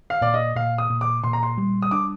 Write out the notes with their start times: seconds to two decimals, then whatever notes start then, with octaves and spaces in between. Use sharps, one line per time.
0.10 F5
0.21 A#2 D5
0.34 D#5
0.56 A#2 F5
0.78 D#6
0.90 A#2
1.01 D6
1.24 A#2 C6
1.33 A#5
1.43 C6
1.58 G3
1.82 D#6
1.91 D4 D6